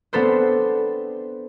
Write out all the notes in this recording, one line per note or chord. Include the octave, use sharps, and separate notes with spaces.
B3 C4 D4 A4 B4 C5